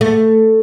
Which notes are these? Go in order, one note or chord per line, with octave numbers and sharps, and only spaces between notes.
A3